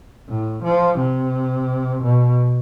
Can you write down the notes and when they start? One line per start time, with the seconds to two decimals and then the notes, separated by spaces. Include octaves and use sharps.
0.29 A2
0.64 F3
0.99 C3
2.03 B2